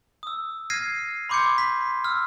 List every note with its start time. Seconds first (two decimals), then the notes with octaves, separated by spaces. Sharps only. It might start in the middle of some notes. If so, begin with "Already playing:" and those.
0.23 D#6 E6
0.70 F6 G#6 A#6 C7 D#7
1.29 B5 C6 D6 G6 G#6 C#7
1.58 B6
2.04 E6 F6